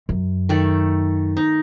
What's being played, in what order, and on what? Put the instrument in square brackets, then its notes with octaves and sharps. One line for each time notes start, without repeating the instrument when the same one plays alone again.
[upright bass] F#2
[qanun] D#3 A3 D5
D#4